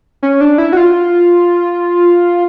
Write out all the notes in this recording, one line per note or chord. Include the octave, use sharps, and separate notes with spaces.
C#4
D4
E4
F#4
F4